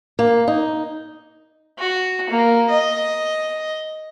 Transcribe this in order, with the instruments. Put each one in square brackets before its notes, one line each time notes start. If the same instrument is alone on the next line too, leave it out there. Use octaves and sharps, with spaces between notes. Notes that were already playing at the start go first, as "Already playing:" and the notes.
[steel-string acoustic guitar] A#3
D#4
[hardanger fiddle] F#4
A#3
D#5